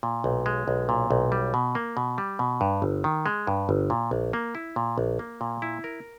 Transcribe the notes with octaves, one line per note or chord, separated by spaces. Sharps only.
A#2
B1
G#3
B1
A#2
B1
G3
B2
A#3
B2
G3
B2
G2
G1
D#3
G#3
G2
G1
A#2
A#1
A#3
E4
A#2
A#1
A#3
A#2
E4
A#4